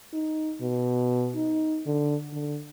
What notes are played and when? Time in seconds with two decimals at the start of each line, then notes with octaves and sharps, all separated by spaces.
0.13 D#4
0.61 B2
1.36 D#4
1.86 D3
2.32 D3